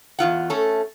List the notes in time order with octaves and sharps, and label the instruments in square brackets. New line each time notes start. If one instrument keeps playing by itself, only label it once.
[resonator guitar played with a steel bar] E2 G#2 F4 F#5
A3 C#4 A4